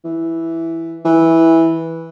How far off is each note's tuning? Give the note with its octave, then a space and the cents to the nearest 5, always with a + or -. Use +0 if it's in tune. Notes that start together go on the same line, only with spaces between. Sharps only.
E3 +0
E3 -10